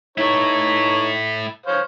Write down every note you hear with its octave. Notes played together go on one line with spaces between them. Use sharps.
D#4 E4 A4 C#5
C5 C#5 F5